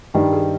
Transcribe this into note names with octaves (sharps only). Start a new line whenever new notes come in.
G2 D#3 G3 G4
G#4